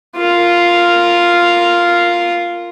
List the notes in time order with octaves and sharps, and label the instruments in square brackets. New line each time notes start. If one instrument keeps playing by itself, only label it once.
[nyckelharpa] F4 A#4